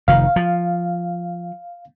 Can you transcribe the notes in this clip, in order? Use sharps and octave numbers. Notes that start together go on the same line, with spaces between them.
F1 D#3 F5
F3